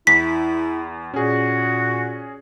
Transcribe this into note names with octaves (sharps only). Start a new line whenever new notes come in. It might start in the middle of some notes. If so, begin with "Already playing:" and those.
E2 E4 B6
A#2 C#4 F#4 G#4